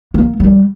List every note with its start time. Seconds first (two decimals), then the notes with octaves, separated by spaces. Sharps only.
0.14 A#3
0.40 G3